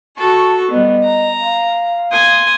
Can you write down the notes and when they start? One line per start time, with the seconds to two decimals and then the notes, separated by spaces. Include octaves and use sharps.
0.17 F#4 A4 A5 C#6
0.71 G3 B3 D#5
1.04 A#5
1.40 F5
2.12 G#5 C6 D#6